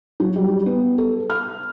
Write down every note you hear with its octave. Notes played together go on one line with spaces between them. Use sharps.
F#3
G3
B3
A4
F6